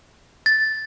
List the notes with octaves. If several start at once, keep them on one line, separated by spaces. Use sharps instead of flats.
A6